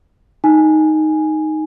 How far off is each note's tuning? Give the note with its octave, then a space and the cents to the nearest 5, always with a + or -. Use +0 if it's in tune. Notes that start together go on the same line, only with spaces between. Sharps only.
D#4 +0 G#5 +0